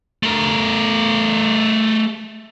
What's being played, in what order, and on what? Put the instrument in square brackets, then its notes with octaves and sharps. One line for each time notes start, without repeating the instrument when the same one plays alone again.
[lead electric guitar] A3 A#4